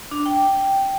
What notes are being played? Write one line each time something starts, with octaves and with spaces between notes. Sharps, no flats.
D4
G5